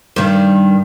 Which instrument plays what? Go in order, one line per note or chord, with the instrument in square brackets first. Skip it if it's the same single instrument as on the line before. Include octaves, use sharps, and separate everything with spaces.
[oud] G2 D#3